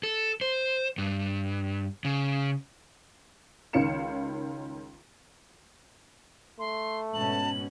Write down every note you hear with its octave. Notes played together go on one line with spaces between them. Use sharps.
A4
C5
G2
C#3
C#2 D#3 C#4 F5 C#7 E7
A3 C6
G#2 B2 C#4 A5 F#7